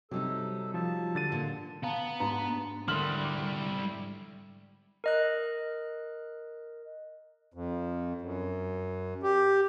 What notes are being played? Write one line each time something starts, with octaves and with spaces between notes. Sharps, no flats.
C3 F#3 G3 D#4 A4
F3 A5
D3 A6 D#7
A#2
B3 F5 A5 A#5
G#2 D4 D#4 F#4 B4 A#5
D3 G3 E4 A#4 C6 F6 F#7
D6
A#4 D#5 F#6
F2
F#2
G4